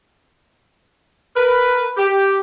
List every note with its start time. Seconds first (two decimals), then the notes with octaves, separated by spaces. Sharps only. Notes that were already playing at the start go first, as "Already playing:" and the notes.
1.36 A#4 B4
1.97 G4